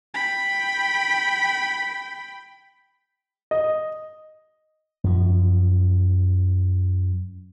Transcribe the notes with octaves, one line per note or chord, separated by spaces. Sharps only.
G5 B5
D#5
F#2 F3